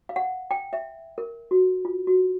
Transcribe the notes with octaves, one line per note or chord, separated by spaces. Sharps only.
F5
F#5
G5
E5
A#4
F#4
F4
F#4